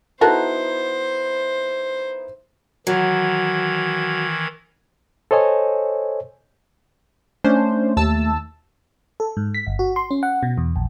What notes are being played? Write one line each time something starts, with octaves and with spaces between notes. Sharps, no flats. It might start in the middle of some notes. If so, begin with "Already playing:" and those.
B3 D#4 E4 F#4 A4 A#4 C5
D#3 E3 F#3 G#6
A4 C5 C#5 D#5 G#5
A3 C#4 D4 C5
D#2 A5 E6
A4
G#2
B6
G1
F#4
C6
C#4
F#5
B2
E2
A#1